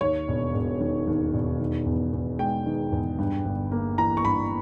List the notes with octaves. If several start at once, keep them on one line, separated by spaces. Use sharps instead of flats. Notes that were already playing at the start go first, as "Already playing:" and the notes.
D#2 C#5
E1
E1
D#3
D#2
E1
D#3
E2
E2
G#3 G5
D#3
E2
G2
G1
A#3
E3 A#5
C#6
G2 B5